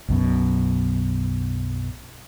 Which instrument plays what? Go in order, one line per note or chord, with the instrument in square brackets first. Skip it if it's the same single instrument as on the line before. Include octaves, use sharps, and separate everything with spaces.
[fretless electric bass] B1 F#2 B2